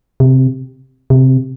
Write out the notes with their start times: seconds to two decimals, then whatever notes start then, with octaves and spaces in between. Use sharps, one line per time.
0.20 C3
1.10 C3